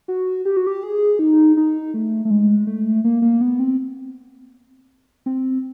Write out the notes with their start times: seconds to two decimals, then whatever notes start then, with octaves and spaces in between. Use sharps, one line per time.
0.08 F#4
0.45 G4
0.57 F#4
0.67 G4
0.83 G#4
1.19 D#4
1.57 D#4
1.94 A3
2.25 A3
2.31 G#3
2.67 A3
3.04 A#3
3.22 A#3
3.41 B3
3.59 C4
5.26 C4